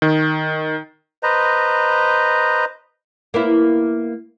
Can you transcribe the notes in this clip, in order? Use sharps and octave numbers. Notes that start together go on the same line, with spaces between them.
D#3
B4 C5 D#5 A#5
A#3 B3 E4